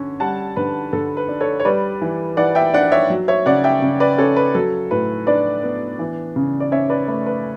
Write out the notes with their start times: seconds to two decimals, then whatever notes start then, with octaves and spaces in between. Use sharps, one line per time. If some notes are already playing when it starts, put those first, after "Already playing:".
Already playing: D3 C#4
0.20 G3 F#5 A5
0.56 D3 B4
0.93 D3 A4
1.17 B4
1.28 D4
1.41 A4 C#5
1.60 C#5
1.65 G3 B4 D5
2.01 E3
2.37 E3 D5 F#5
2.55 E5 G5
2.74 D4 D5 F#5
2.92 C#5 E5
3.10 F#3
3.28 C#5 E5
3.46 C#3 D5 F#5
3.64 E5 G5
3.82 C#3
4.00 B4 D5
4.18 C#4 A4 C#5
4.36 B4
4.55 F#3 A4
4.91 A2 B4
5.27 D4 B4 D5
5.63 B3
5.99 E3
6.36 C#3
6.60 D5
6.72 C#4 C#5 E5
6.90 B4 D5
7.08 A3 B4
7.26 B4